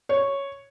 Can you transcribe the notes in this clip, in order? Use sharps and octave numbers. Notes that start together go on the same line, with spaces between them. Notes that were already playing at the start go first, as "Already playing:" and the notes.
C#5